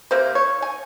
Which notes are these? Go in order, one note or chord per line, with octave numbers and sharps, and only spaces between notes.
C3 A#3 C5
C#5
G#5